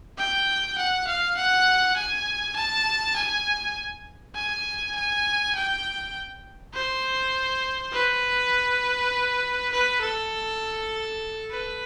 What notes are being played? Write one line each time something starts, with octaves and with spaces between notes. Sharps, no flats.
G5
F#5
F5
F#5
G#5
A5
G#5
G#5
G#5
G5
C5
B4
B4
A4
B4